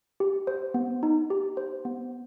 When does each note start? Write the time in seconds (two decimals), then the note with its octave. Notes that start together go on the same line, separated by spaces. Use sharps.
0.20 G4
0.47 C5
0.74 B3
1.03 D#4
1.30 G4
1.57 C5
1.85 B3